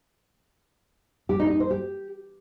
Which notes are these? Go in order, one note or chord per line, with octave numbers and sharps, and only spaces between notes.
G4
D#4
D#4
C5
G4